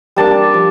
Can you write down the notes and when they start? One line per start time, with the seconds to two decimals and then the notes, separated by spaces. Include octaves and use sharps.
0.16 G3 A#3 D4 A5
0.54 F3